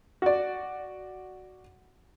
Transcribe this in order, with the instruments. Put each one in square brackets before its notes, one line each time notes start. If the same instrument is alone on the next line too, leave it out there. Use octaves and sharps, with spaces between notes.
[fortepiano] F#4 D5